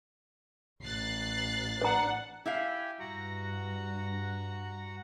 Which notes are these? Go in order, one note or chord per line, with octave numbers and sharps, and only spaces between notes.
A1 F#6 A6 C7
D4 C5 F#5 A#5
E4 G4 E5 F5 G5 G#5
G2 F#4 F#5 A#5